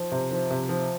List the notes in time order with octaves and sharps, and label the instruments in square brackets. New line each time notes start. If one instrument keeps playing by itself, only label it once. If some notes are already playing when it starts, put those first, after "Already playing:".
Already playing: [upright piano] F3
C3
F3
C3
F3